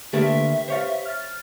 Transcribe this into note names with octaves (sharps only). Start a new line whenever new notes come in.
D3 A3 A#3 G4 B4 E5
C5 C#5 F5
F6 A6